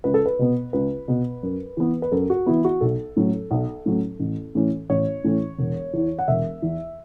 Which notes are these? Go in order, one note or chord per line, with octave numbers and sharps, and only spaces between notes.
C#2 B4
A4
B4
B2 B3
C#2 B4
B2 B3
F#2
E3 B3
B4
F#2 A4
F#4
E3 B3 E4
F#4
B1 A4
A2 F#3 C#4
B1
A2 F#3 C#4
A1
A2 E3 C#4
A1 C#5
A2 E3 C#4
E1
E2 E3
F#5
E1 E5
E2 E3